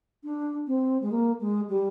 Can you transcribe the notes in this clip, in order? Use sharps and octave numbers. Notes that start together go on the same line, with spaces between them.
D4
C4
G#3
A#3
G#3
G3